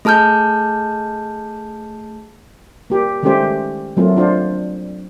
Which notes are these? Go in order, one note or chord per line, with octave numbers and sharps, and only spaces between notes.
A3 G#4 A5 F6 G6
A#3 G4
D#3 G#3 A3 C#4 G4 C5
F#3 A3 A#3 C4 F4
D4 F4 C5